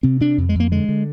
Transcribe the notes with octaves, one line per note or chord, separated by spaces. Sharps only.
C3 C4
C3 D4
F2
G#3
F2 A#3
D3 G#3
D3